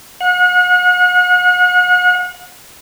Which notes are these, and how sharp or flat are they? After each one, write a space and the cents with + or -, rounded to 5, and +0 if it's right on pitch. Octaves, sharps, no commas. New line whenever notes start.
F#5 -40